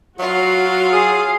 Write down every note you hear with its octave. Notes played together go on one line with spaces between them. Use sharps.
F#3 F4 F#4 F5
G#4 D#6